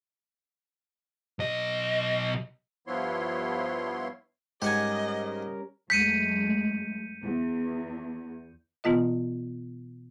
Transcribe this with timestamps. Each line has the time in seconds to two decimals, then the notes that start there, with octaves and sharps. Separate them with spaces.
1.39 B1 D#5
2.87 G2 F3 B3 E4 C#5 C6
4.62 G#2 G3 C#4 G4 A#4 D#5 F#5 G#5
5.90 F#2 G#3 A3 G6 B6 C#7 D#7
7.23 E2
8.84 B2 E3 B3 F4 D#5